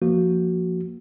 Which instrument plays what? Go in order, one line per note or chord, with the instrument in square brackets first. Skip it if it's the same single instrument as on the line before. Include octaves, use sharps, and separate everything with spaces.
[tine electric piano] F3 A#3 F#4